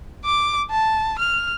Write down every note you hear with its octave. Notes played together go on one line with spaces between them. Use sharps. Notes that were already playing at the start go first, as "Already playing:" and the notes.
D6
A5
F6